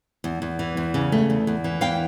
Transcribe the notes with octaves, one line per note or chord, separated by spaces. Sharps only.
E2
E2
E3
E2
C#3
A3
E2
E2
E3
E2 F5 G5